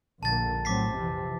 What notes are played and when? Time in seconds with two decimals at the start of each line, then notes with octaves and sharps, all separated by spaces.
0.23 A#1 D3 A#3 A5 A6
0.65 A2 F#3 C4 D6 B6 C7
0.95 F2 C3 E3